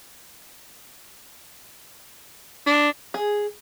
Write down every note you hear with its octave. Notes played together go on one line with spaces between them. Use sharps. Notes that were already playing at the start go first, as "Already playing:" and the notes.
D4
G#4